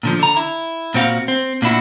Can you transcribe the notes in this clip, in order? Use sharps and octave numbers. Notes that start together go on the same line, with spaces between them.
A#2 D3 F3
D3 A#5
E4
A#2 C4 F#4 F5
C4
A#2 D4 E4 F#4